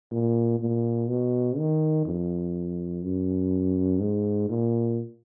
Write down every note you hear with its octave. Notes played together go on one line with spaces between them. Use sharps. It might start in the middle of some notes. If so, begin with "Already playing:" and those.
A#2
A#2
B2
D#3
F2
F#2
G#2
A#2